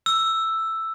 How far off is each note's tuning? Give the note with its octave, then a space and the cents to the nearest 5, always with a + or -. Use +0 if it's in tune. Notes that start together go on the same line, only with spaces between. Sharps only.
E6 +5